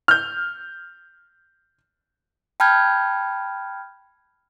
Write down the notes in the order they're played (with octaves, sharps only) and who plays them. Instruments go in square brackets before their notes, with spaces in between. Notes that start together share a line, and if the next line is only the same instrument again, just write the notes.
[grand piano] F6 G6
[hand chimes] G5 A5 B5 F6 G6 G#6